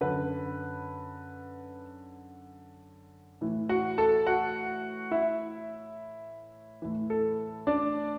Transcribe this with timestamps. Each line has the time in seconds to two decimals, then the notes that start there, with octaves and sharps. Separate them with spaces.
0.01 F#2 D3 B4
3.41 A2 E3
3.69 F#4 F#5
3.98 A4 A5
4.26 F#4 F#5
5.11 E4 E5
6.82 A2 E3
7.10 A4
7.67 D4 D5